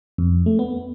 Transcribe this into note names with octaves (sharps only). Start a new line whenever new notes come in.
F2
A3
B3